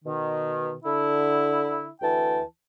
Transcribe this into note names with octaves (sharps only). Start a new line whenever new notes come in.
B2 D#3
D3 E4
D2 E3 G5 A5